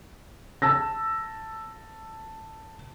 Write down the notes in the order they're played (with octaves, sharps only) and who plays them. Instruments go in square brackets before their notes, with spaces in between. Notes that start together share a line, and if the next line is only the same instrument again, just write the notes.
[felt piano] A5 E6 A#6